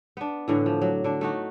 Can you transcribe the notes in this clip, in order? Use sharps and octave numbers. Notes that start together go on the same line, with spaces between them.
B3 D4
A2 D3 E3
F3
F#3
D3 D4
A3 D#4 F#4